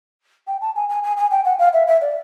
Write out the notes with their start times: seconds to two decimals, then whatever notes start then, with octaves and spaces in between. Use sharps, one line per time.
0.47 G5
0.61 A5
0.76 G#5
0.89 G#5
1.03 G#5
1.17 G#5
1.31 G5
1.45 F#5
1.59 F5
1.73 E5
1.87 E5
2.01 D5